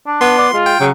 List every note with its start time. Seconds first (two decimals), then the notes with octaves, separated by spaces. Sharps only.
0.07 D4
0.21 B3 C6
0.38 D5
0.53 G#3 F4
0.66 G5
0.80 C#3 F#3